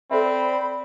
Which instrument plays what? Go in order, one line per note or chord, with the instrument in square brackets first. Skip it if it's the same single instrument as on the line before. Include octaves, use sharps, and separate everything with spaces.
[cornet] C4 [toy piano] A4 C5 E5 [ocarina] D5 [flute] B5